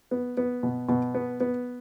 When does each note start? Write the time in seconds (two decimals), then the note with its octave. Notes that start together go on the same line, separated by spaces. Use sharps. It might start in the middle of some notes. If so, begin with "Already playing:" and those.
0.11 B3
0.37 B3
0.63 B2
0.89 B2
1.15 B3
1.40 B3